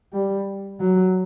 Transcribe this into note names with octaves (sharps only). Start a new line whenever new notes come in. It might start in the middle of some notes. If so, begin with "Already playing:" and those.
G3
F#3